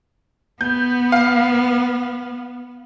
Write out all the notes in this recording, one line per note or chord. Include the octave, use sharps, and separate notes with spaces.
B3 G6
F5